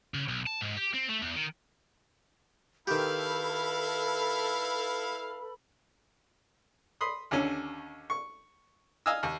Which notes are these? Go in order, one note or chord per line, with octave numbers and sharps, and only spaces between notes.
C#3
B1
A5
G#2
G4
C4
A3
E2
D#3
D#3 E4 G4 A4 B4 F5 B5
B5 C6 D#6
D#2 D3 C#4
C#6
D#5 F5 G#5 D#6 E6
D#2